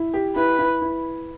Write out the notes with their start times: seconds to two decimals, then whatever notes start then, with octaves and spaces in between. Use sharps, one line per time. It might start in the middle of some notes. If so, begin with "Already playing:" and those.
Already playing: E4
0.14 G4
0.36 E4 B4
0.59 E4
0.82 E4